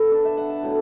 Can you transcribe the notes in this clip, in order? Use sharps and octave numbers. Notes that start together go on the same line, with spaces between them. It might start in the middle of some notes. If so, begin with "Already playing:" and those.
Already playing: D3 B3 A4 B4
D4
E5
F#5
A5
A2 F#3 B3